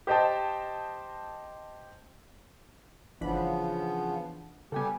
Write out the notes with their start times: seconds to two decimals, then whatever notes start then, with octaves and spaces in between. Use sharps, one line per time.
0.07 G4 C5 D#5 G5 A5
3.21 G1 C#3 E3 F3 B3 D4 B5
4.72 C#3 G3 B3 G4 A4 G5 G#5